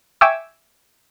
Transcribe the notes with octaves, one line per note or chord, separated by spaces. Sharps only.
E5 G5 G#5 C#6 D6 E6